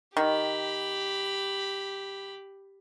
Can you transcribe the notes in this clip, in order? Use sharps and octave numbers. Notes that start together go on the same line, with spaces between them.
D#3 G4 B5